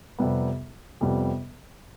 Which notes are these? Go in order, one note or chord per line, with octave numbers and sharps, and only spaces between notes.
F2 C3 G3 B3
F2 C3 G3 B3